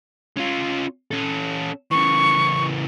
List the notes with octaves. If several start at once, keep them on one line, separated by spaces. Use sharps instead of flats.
C#4 F4
C#4 A4
C#3 E3 C#6